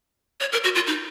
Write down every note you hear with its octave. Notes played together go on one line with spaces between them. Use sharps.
C#5
A#4
F#4
F4
D#4